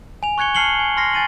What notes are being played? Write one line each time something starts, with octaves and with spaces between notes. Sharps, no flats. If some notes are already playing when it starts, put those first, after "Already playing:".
G#5 F7
C#6 F#6 G#6 C#7 G7
A5 F6 C7 C#7 F#7 G7
G#5
C6 F6 A#6 C7
G#5 A6 D#7 F#7